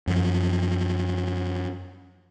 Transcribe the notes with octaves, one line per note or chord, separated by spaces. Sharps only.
F#2 F3